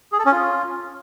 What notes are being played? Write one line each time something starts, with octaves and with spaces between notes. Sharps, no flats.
G#4
A4
C#4
F4